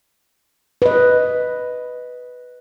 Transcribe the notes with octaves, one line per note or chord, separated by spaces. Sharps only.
B4 D#5